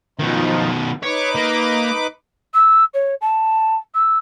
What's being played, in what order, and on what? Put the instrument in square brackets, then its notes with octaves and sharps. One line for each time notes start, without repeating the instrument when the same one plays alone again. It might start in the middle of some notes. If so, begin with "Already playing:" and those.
[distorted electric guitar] B2 D#3 [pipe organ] F3 D#4 F4
[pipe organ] D#4 B4 D6 [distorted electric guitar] C#5
[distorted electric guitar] A#3
[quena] E6
C#5
A5
E6